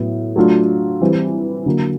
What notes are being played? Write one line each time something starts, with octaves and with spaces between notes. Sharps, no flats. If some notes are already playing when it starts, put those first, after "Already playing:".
Already playing: A2 F#3 B3 E4
F#3 A3 D4 F4
E3 G3 C4
D3 F#3 A#3